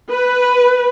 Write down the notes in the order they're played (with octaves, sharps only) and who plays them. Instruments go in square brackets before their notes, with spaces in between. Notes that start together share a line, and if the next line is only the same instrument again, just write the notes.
[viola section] B4